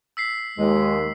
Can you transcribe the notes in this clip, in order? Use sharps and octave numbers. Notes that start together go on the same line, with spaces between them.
E6 B6 C7
D#2 G#3